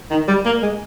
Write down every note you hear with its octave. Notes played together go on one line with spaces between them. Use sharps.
D#3
G3
A#3
G#3